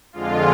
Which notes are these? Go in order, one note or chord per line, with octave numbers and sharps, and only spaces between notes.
F2 D3 G#3 F4